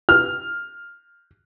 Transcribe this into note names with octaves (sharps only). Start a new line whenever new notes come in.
F6